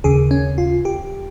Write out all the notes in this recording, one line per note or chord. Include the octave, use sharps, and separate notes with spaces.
D#2 C#3 G#4
C#4
F4
G4